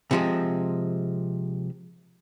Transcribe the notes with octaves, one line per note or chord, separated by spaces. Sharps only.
C3 F3 G#3